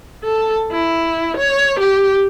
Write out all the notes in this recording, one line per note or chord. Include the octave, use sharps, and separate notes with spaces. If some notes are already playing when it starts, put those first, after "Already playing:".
A4
E4
C#5
G4